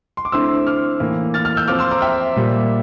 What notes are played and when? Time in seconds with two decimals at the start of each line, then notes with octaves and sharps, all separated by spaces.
0.17 C6
0.25 D6
0.32 D3 A3 C4 E4 C6 E6
0.67 D6 F6
1.00 A2 E3 A#3
1.34 F6 A6
1.45 F6 A6
1.57 E6 G6
1.68 F3 C4 F4 D6 F6
1.79 C6 E6
1.91 A#5 D6
2.02 E5 G5
2.36 A#2 G3 A#3